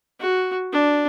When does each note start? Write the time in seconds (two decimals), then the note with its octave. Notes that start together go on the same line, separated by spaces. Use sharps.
0.20 F#4
0.72 D4